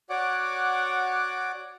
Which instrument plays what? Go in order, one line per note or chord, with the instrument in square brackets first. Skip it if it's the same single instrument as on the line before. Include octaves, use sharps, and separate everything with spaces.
[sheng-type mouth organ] F#4 C#5 D5 F#5 D6